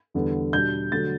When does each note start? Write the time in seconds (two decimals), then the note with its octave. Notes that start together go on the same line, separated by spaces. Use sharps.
0.14 E2 D3 G3 B3
0.53 B2 G3 D4 G6
0.92 D3 F#3 A3 A6